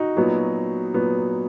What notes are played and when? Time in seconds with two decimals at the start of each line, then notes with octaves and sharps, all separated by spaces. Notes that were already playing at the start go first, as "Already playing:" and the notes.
Already playing: D#4 F#4
0.17 A#2 F#3 B3
0.94 A#2 F#3 B3